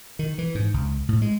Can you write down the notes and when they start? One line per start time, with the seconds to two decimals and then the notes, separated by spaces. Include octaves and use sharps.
0.19 D#3
0.38 E3
0.55 G#2
0.74 C#2
1.09 A2
1.22 G#3